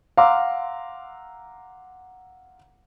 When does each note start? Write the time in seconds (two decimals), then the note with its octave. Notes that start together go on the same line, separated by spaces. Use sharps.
0.17 F5 F#5 A#5 C6 D6 E6